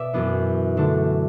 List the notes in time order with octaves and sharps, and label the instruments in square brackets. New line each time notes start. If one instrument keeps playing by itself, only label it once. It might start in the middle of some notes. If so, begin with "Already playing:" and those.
Already playing: [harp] B2 D5 E5
F#2 E3 B3 D4
D3 A3 D4